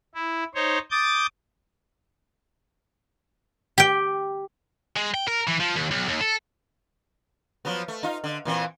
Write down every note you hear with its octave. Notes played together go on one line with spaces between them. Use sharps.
E4
D#4 C5 C#5
D6 D#6 G6 A6
G4 G5
G#3
G5
A#4
E3
F3
D#2
B1
D#2
A4
F3 F#3 B3
A3
D#4 F4
D3
A#2 E3 C4